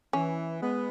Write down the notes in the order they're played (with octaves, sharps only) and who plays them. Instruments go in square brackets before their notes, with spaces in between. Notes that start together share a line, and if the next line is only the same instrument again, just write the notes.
[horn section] E3 [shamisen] C#4
[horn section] G#3 B3